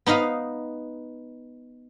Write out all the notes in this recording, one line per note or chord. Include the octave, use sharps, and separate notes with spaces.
B3 D#4 D#5 F5